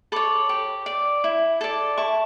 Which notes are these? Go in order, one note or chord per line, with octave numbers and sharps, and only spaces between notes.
A4 C#5 B5 D6
G4
D5
E4
A4 D5
E4 A5 C#6